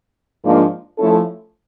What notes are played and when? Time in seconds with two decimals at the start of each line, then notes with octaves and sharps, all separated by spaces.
0.43 G#2 F3 A#3 D4 F4
0.99 F3 A3 C#4 E4 A4